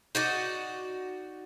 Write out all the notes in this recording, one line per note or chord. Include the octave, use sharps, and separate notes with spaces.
D#4 F#4 D5